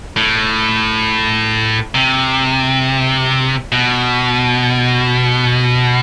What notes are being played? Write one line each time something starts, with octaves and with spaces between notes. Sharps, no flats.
A2
C3
B2